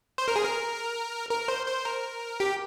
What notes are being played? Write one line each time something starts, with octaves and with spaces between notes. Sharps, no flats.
C5
A#4
G#4
A#4
A#4
C5
C5
A#4
G4